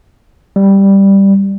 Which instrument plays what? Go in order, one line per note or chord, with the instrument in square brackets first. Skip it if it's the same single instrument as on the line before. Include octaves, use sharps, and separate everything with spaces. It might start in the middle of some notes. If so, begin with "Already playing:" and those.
[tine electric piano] G3